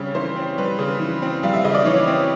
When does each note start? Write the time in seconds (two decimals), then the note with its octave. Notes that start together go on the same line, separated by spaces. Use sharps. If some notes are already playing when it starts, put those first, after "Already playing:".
Already playing: C#3 G3 C4 C#5
0.15 E3 C5
0.36 C4
0.58 G3 B4
0.79 C#3
1.00 E3
1.22 C4
1.43 G3 F5
1.53 E5
1.65 C#3 D#5
1.75 D5
1.85 E3 C#5
2.07 C4